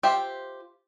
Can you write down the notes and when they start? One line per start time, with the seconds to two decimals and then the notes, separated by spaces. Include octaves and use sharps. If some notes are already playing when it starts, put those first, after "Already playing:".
0.03 F4 G4 C5 E5